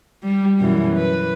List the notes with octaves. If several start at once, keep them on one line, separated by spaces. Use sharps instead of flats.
G3
F#2 B2 E3
B4